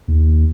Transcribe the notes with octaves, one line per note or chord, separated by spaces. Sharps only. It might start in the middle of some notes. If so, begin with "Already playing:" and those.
D#2